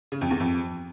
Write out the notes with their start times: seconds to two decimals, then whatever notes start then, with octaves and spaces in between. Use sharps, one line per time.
0.12 C#3
0.21 F2
0.31 E2
0.40 F2